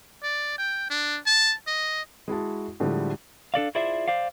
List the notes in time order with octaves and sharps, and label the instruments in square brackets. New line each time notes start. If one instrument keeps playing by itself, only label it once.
[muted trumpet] D5
G5
D4
A5
D#5
[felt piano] G#3 E4 F#4 A5
A2 D3 F3 G3 G#3
[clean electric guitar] D4 A4 D5 F5
E4 F4 G#4 C5 D5 E5
C5 D5 F5